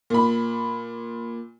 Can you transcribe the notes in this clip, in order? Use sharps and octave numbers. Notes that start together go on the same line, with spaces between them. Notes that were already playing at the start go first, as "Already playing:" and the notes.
A#2 B5